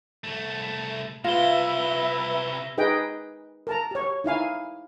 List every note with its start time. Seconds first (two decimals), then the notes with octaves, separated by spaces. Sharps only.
0.24 C2 A3
1.24 C3 E4 F4 B4 E5 A#6 G7
2.78 D#4 G#4 B4 D#5 G5
3.67 A#4 A5 A#5
3.91 G4 C#5
4.24 D#4 E4 F5 G#5